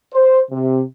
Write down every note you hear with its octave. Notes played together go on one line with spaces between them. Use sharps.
C5
C3